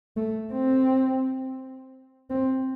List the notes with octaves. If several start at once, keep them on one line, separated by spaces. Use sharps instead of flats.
A3
C4
C4